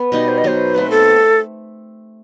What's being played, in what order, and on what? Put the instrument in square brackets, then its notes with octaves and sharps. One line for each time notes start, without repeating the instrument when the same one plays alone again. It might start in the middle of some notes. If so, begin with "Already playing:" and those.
Already playing: [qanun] B3
[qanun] B2 G3 D#4 G4 [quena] D#5
[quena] C5
D#5
[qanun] B2 F#3 B3 [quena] C5
[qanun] B2 A3 C4 [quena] B4
[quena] A4